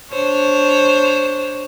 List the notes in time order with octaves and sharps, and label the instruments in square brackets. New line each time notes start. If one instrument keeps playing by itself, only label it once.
[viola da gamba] D4 C5 C#5